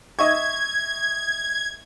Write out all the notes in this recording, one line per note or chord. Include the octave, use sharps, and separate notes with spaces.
D#5 E5 C#6 G#6